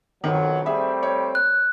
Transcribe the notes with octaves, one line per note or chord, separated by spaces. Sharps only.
B1 F2 D#3 F#3
G3 A3 C4 G#4 E5
C#5
F#6